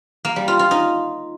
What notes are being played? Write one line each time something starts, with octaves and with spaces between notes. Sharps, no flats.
A#3
G3
F4
F4
D#4